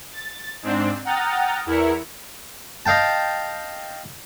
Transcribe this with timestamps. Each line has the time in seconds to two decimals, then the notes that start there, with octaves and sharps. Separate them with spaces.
0.13 A6
0.62 G#2 C4 D4
1.05 F#5 G5 A#5 D#6 F6 A6
1.66 E2 E4 A#4 C#7
2.86 D#5 F5 G5 A5